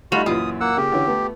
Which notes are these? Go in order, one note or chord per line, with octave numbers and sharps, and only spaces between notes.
G3 A3 D#4 F4 F#4 B5
F#2 A#2 E3 F4 D#6
A#3 F#5 E6
C#3 A#3 G4
D3 E3 C#4
A3 B3